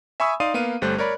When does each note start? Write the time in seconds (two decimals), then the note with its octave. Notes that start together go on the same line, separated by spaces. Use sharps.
0.20 E5 G#5 B5 C#6 D#6 E6
0.40 D#4 D5 F5 C6 D#6 D#7
0.54 A#3 B3 F5 D#7
0.82 G1 G3 A3 C5 F#6
0.98 A#4 C#5 D5 B5